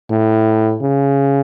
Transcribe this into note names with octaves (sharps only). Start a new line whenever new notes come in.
A2
C#3